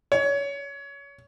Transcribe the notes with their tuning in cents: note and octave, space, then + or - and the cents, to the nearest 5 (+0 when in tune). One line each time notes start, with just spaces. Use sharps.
C#5 +25